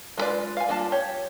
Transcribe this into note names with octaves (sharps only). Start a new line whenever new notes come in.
G#3 B3 F4 B4 D5
F5 G#5
G3 A#3 D4 F4 A5
G4 C#5